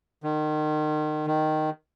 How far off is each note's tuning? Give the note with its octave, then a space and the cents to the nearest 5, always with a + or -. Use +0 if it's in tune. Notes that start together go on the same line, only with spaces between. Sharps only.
D#3 -30
D#3 -5